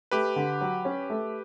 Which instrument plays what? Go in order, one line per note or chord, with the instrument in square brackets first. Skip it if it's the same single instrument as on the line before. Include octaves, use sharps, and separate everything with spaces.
[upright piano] A3 [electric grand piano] G4 B4
[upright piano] D3
F#3
C#4
A3